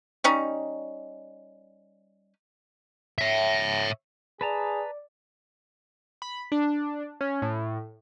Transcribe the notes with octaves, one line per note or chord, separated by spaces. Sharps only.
G3 C#4 D#4
C#5 E5
G#4 B4 D5 A5 A#5
B5
D4
C#4
A2